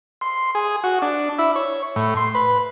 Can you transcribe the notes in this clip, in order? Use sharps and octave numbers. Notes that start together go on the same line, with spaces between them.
C6
G#4
F#4
D4
E4
C#5
A2
C6
B4